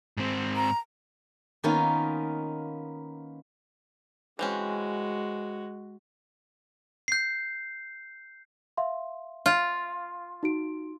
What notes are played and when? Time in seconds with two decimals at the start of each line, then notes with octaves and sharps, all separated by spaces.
0.17 G#2 C4
0.56 A#5
1.64 D#3 A#3 B3 C#4 D#4 F4
4.39 E3 G#3 C4 C#4 F#4
7.08 G6 C7
8.77 E5 F5 C6
9.46 F4
10.43 D#4 F#4 D7